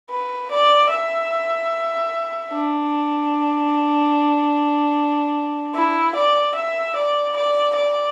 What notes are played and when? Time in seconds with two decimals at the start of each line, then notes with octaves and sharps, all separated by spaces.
0.10 B4
0.51 D5
0.91 E5
2.52 D4
5.75 E4
6.15 D5
6.55 E5
6.95 D5
7.36 D5
7.76 D5